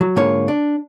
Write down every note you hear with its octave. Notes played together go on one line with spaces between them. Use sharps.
F#3
G#2 D3 A#3 F4 C#5
D4